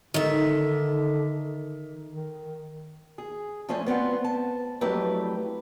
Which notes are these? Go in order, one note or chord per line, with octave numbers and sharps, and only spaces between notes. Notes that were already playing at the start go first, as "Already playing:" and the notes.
D3 D#3 E5
D#3
G#4
F3 A3 C#4 C5 G#5 A5
B3 C4 F4 F#5
A5
F2 F#3 A3 E4 G4 B4